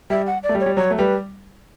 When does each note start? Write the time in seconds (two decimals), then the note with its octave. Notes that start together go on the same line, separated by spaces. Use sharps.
0.10 G3 E5
0.27 F#5
0.43 D5
0.49 A3
0.55 G3
0.60 C#5
0.66 G3
0.76 F#3 C#5
0.91 A3
0.98 G3 B4